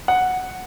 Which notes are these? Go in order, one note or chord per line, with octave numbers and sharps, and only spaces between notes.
F#5